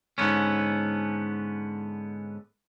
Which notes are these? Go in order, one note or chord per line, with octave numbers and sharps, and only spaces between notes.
G#2 D3 B3 C#4